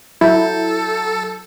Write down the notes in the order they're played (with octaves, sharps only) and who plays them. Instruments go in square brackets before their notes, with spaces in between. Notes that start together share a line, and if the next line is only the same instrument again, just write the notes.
[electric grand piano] F#3 G6 [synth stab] E4 [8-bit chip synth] A4